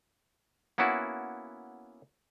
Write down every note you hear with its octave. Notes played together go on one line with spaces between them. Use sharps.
A#3 B3 C#4 E4 F#4